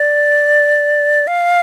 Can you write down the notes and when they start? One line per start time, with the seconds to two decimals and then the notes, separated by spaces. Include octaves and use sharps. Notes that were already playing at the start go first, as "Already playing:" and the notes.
Already playing: D5
1.27 F5